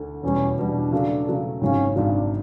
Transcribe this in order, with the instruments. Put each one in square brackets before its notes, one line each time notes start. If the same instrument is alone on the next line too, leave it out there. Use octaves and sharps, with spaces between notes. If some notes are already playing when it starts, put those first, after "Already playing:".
Already playing: [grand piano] D2 D3
[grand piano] E2 B2 G3 [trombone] C#4
[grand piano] E2 B2 G3 [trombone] D4
[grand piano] C#3 F#3 A3
C#3 F#3 A3
[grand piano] G#1 F#2 C#3 F#3 [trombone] C#4
[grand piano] G#1 F#2 C#3 F#3 [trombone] D4